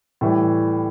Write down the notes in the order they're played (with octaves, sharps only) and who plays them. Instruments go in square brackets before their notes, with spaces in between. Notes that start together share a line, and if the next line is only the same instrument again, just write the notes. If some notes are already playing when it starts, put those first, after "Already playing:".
[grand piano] A2 E3 G3